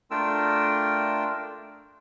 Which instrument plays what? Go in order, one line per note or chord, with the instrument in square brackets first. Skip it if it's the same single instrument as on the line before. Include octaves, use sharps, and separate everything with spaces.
[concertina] A3 D4 F4 A#4 G5 E6